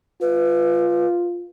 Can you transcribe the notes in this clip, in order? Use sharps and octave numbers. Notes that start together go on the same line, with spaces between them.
F4 B4